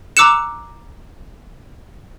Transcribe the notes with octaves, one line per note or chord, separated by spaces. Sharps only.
A#5 D6 E6 F#6 C#7 E7